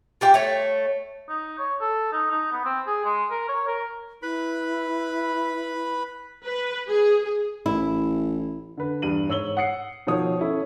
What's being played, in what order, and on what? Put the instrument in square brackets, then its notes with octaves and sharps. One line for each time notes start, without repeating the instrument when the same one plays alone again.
[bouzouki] F4 G4 G5
A3 C#5
[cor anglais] D#4
C#5
A4
D#4
D#4
B3
C4
G#4
G#3
A#4
C#5
A#4
[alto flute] E4 [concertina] B4 B5
[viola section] B4
G#4
G#4
[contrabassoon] A1 [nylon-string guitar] E4
[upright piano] D3 B4
E2 G2 D#7 F#7
G#2 C#5 E6 F#7 G7
F#5 D#6 C7 C#7
B2 D#3 F3 C#5 D#6
C#4 E4 A4